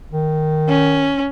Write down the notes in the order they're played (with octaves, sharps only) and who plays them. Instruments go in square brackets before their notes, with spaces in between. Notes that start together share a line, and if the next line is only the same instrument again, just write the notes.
[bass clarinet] D#3
[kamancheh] C#4